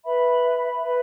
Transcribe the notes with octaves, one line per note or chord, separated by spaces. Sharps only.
B4 E5 B5
B4 E5 B5